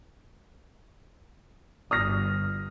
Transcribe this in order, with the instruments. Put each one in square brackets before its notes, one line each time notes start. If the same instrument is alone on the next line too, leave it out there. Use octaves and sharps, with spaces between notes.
[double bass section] G1 [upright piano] D#6 F6 A#6